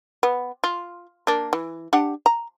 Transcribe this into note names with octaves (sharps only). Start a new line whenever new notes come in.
B3
F4
A#3 D4
E3
D4 G4 F#5
A#5